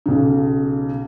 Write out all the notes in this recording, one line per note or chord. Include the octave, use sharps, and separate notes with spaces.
B1 C#3